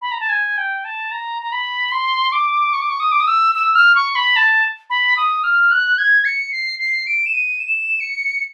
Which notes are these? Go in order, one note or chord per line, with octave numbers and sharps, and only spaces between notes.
B5
A#5
A5
G#5
G5
A5
A#5
A#5
B5
C6
D6
C#6
D6
C#6
D#6
D6
D#6
E6
E6
F6
C#6
B5
A5
B5
D#6
F6
F#6
G#6
C#7
C7
C7
D7
E7
D#7
E7
C#7